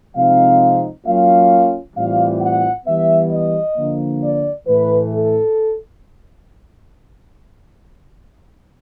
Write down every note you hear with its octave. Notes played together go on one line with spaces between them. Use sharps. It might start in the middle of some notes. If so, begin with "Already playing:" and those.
C3 F3 G#3 C4 D#4 F5
F#3 A#3 C#4 F4 F5
A2 E3 G3 C4 F4 F5
F#5
E3 G3 B3 E5
D#5
D3 F3 A#3
D5
A2 E3 A3 B4
A4